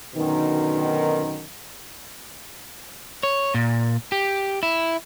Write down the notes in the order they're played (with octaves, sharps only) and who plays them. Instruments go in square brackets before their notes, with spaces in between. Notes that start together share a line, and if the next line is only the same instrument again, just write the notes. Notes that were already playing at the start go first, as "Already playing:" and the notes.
[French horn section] F#2 B2 D3 D#3
[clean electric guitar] C#5
A#2
G4
E4